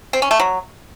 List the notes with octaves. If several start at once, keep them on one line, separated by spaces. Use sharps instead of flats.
C4
C#4
A3
F#3